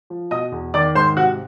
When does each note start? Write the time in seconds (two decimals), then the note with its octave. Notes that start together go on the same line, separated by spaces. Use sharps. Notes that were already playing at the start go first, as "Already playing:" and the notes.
0.10 F3
0.31 B2 D#5 D#6
0.52 E2
0.74 D#3 D5 D6
0.95 G#2 C5 C6
1.17 C3 F#4 F#5